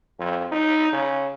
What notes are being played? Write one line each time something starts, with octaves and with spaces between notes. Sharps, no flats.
F2
D#4
C#3